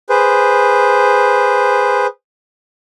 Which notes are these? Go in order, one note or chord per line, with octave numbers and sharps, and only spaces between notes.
G#4 B4 C5